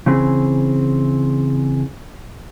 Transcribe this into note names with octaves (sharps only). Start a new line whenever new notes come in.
C#3 E3 C4 G#4